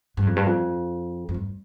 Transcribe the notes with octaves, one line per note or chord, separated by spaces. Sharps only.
G2
F2
G2
F2
F2
G2